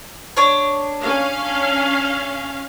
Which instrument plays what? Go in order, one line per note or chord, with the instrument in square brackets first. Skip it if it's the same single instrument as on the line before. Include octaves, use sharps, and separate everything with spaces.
[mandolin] D4 C#5
[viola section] C#4 F5